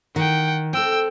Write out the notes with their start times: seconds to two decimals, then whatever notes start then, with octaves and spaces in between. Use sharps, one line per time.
0.16 D#3 F#5 G5
0.73 C4 A4 G5 E6